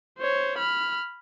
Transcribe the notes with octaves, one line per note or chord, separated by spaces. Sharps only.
C5 C#5
B5 F6